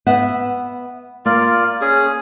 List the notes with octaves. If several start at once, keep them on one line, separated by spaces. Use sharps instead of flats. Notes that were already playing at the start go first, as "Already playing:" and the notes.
B3 E5 F#5
A#3 F4 D5
C#4 G#4